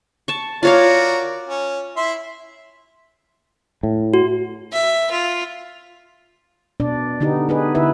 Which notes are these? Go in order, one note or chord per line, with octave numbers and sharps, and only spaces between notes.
A5 C#6
F4 F#4 A#4 C#5 D5 F5
C#4
E4 E5 C6
A2
F#4
E5
F4
B2 D4 D5
D3 B3 D#4 G4
D#4 G#4 B4
D3 E4 B4 E5